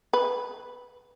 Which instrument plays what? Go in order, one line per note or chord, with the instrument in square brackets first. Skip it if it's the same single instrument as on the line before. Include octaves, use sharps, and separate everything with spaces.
[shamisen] B4